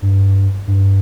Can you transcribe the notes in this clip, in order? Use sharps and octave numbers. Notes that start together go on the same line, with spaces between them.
G2
G2